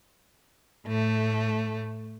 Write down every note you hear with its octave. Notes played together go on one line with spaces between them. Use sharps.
A2 A3